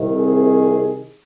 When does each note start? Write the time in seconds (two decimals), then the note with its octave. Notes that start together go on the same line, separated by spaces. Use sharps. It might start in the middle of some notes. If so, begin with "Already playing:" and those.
Already playing: C2 C3 D#3
0.14 G#4